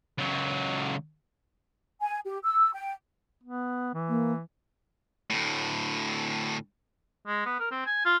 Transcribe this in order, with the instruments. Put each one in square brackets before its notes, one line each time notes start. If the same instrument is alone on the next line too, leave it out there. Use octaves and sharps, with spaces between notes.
[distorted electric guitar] C#2 F#3
[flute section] G#5
G4
E6
G5
[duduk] B3
E3
[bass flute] A#3
[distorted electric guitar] D2 A2
[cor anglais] G#3
B3
A#4
C4
G#5
F4